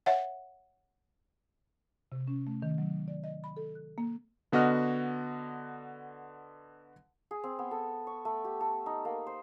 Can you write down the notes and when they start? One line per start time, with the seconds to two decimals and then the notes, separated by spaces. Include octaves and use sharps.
0.06 C#5 E5 F#5
2.12 C3
2.28 C#4
2.47 A3
2.62 D#3
2.78 F#3
3.08 D5
3.24 D#5
3.44 B5
3.57 A4
3.75 F#6
3.98 A#3
4.52 D3 B3 F#4 D#5 F6
7.31 G#4
7.44 C4
7.59 B3
7.71 A4
8.07 C#6
8.25 A3
8.45 G4
8.61 A4
8.86 D#4
9.05 A#3
9.27 C5